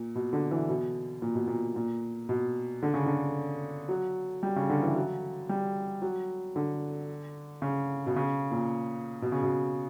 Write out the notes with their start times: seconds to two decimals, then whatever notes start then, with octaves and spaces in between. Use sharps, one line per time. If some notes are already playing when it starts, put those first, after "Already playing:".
Already playing: A#2
0.15 B2
0.33 D3
0.51 E3
0.69 B2
1.22 A#2
1.35 B2
1.47 A#2
1.76 A#2
2.29 B2
2.82 D3
2.94 C#3
3.06 D3
3.89 F#3
4.43 G3
4.56 C#3
4.70 D3
4.82 E3
4.96 F#3
5.49 G3
6.02 F#3
6.56 D3
7.62 C#3
8.06 B2
8.16 C#3
8.51 A#2
9.22 B2
9.32 C#3
9.43 B2